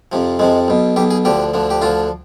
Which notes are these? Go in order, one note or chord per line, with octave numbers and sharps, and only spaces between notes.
F2 C3 F3
F2 C3 F3 G#3
B1 B2
B1 B2 G4
G#4
D2 D3 F3 G4
D2 D3 F3
G4
D2 D3 F3 F4